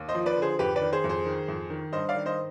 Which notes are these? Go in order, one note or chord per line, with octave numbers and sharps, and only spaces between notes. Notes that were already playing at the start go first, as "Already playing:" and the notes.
Already playing: D#2
C5 D#5
F3
B4 D5
D3
G#4 C5
F2 G4 B4
B4 D5
D#3
G#4 C5
F2
G#4 C5
D#3
F2
D#3
G2 C5 D#5
D5 F5
D#3
C5 D#5